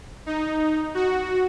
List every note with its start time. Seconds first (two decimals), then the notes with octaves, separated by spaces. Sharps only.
0.26 D#4
0.94 F#4